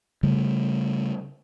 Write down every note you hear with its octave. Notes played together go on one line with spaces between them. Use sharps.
C#3 G3 A3